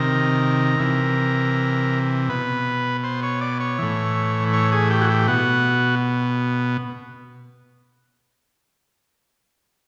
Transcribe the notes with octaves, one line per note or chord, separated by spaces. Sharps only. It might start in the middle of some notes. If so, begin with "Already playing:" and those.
Already playing: C3 D#3 A#4
C3 E3
B2 B4
C5
C#5
D5
C#5
A2 E3
C#5
G#4
G4
F#4
G4
B2 F#4